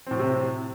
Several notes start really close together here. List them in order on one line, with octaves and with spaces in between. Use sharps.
C4 A2 F#3 C3